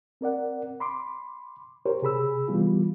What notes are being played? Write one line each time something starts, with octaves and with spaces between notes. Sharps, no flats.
C4 A#4 D5 F#5
B5 C6 D6
G4 A#4 C5 C#5
C3 G#4 B5 E6
E3 G3 B3 F4